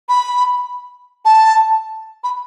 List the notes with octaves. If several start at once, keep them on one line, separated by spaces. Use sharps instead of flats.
B5
A5
B5